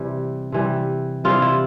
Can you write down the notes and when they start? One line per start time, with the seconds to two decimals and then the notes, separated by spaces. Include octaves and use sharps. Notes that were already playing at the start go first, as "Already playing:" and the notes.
Already playing: C3 E3 G3
0.52 C3 E3 G3
1.24 C3 E3 G3 F4
1.42 E4